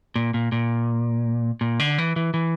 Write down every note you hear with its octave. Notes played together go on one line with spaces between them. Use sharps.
A#2
A#2
A#2
A#2
D3
E3
E3
E3